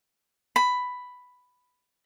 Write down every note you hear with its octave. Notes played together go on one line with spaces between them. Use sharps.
B5